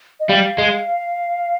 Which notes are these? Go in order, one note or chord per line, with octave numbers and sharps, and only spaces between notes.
D#5
G3 F5
G#3